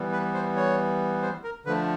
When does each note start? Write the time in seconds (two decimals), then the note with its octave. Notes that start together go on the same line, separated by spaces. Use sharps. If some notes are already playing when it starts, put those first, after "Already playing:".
Already playing: E3 G3 B3
0.12 B4
0.34 C5
0.56 C#5
1.22 C5
1.44 A#4
1.65 D3 F3 A3 B4